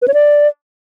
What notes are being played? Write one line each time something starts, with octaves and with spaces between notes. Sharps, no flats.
B4
C#5
D5